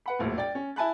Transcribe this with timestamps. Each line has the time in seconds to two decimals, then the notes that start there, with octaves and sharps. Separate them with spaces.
0.06 B4 F#5 B5
0.19 E1 A#1 A2
0.38 D5 G5 A6
0.55 C#4
0.76 E4 G#5 A5 B5 F#6